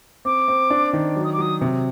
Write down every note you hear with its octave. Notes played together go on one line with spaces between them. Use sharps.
C4 D6
C4
D4
D#3
F#3
D#6
D6
F#3 D#6
C3